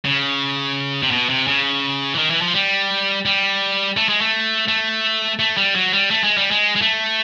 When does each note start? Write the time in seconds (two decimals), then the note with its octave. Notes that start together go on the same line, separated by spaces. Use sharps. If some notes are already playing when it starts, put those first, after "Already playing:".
0.05 C#3
1.03 C3
1.11 B2
1.29 C3
1.47 C#3
2.14 E3
2.18 D#3
2.30 E3
2.42 F3
2.54 G3
3.26 G3
3.97 A3
4.09 G#3
4.21 A3
4.68 A3
5.39 A3
5.57 G3
5.75 F#3
5.93 G3
6.11 A3
6.24 G#3
6.37 G3
6.51 G#3
6.76 G#3
6.82 A3